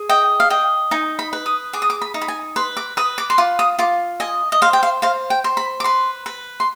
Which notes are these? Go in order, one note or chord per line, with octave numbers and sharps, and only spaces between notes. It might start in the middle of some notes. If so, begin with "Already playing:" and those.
Already playing: G#4
D#5 G5
F5
D#5 G5
D#4 G#5
B5
B4
D#6
G#4 D6
D#6
D6
B5
D#4
B5
G#5
B4 C6
D6
B4 D#6
D6
C6
F4 D6
D#6
F4 D6
D#5 G#5
D#5
C5 F5
G5
F5
C5 F5
G5
C5
B5
D6
B4 C6
B4
C6